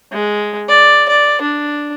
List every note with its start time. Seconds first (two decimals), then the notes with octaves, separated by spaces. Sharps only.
0.12 G#3
0.69 D5
1.08 D5
1.42 D4